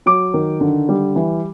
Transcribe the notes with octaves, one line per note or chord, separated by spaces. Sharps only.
F#3 D6
D#3
D3
G3
E3